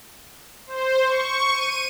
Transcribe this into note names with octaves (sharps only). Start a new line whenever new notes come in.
C5
C#6
D#7